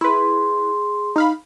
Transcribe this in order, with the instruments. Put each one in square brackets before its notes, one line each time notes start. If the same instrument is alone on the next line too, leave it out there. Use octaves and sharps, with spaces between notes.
[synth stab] E4 B4 [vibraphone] G#4 C6
[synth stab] D#4 F5 B5